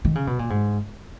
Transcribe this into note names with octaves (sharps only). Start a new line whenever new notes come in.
D#3
C#3
B2
A#2
G#2